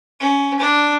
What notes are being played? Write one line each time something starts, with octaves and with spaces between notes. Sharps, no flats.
C#4
D4